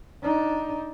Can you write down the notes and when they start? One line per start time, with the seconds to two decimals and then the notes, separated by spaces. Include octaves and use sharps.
0.23 D4 D#4